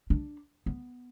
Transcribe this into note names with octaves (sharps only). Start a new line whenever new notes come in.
D4
B3